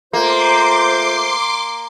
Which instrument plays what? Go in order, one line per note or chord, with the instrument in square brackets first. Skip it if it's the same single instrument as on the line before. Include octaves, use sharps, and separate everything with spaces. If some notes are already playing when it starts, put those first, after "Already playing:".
[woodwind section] A3 F4 C5 [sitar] A#3 [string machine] C6 D6 C7